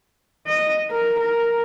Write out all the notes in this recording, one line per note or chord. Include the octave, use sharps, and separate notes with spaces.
D#5
A#4
A#4